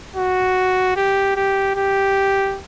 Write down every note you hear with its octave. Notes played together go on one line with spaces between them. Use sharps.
F#4
G4
G4
G4